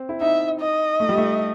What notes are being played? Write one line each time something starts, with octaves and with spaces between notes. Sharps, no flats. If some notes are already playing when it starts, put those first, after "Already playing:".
Already playing: C4
E4
D#4 E5
D#5
A3
G3
A3